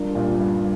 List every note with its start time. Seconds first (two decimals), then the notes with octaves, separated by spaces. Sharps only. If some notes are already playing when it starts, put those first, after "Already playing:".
Already playing: G3 D4 F4 A#4
0.15 A#2
0.38 G2